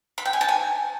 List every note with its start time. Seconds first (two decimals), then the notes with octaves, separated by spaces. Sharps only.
0.18 B5
0.25 G5
0.33 G#5
0.41 A5
0.49 G#5